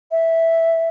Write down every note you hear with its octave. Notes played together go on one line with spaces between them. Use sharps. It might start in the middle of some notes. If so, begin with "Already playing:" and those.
E5